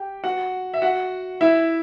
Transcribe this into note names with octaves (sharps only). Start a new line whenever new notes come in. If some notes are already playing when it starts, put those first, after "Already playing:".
Already playing: G4 G5
F#4 F#5
E5
F#4 F#5
E4 E5